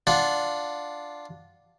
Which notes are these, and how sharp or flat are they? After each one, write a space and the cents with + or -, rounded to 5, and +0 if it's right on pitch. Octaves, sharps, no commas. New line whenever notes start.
D4 +0 F4 +0 F#5 +0